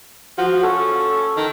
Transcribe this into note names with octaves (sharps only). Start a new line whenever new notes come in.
F3 F#4
C#4 A4
D#3